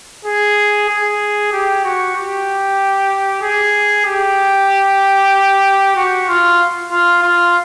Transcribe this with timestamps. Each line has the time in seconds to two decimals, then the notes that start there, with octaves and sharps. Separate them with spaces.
0.25 G#4
0.88 G#4
1.52 G4
1.84 F#4
2.15 G4
3.42 G#4
4.06 G4
5.96 F#4
6.28 F4
6.91 F4
7.22 F4